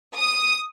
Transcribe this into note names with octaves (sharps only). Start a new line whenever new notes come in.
D#6